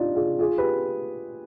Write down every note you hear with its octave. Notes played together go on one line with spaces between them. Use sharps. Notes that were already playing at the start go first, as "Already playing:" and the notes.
Already playing: D4 D#4 F4 G4
F4 G#4
F4 G#4
G4 B4